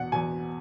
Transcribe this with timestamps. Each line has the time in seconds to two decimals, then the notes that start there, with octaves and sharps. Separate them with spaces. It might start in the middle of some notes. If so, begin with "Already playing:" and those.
Already playing: E2 B2 F#5
0.12 E2 B2 G#5